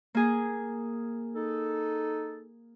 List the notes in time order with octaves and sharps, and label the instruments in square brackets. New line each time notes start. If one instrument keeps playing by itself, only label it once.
[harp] A#3 G#4
[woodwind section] D#4 A4